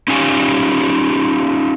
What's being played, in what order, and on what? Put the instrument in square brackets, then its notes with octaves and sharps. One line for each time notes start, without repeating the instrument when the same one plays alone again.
[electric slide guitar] C#4 D#4 F4 G4 G#5